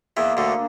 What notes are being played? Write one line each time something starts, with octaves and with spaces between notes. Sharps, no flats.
E2 E3 A#3
D2 D3
D4